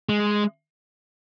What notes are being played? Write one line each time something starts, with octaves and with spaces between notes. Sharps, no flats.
G#3